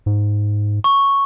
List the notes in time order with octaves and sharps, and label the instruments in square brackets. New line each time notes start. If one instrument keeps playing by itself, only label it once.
[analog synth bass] G#2
[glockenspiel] C#6